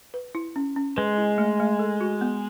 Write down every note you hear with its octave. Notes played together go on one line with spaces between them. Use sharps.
B4
E4
C#4
C#4
G#3 B4
E4
A3
A3
A4
F#4
B3